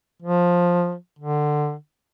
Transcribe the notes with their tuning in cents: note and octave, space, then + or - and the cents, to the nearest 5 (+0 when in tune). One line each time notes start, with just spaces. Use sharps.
F3 +10
D3 +20